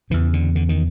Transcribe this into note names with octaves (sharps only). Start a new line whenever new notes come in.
E2 C#3 E3
D3
D3
D#3